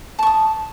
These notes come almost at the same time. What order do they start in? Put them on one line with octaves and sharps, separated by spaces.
A5 C#6 D#6